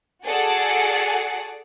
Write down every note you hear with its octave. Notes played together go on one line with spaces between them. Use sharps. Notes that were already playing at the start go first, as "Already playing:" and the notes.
F#4 G#4 A4 D5 F#5